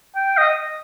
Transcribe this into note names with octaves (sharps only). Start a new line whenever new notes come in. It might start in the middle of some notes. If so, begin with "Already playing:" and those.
G5
D#5